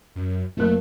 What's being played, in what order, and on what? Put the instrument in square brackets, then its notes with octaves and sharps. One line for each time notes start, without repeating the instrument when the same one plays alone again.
[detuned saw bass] F#2
[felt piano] F#1 A#3 F#6 [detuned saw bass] A3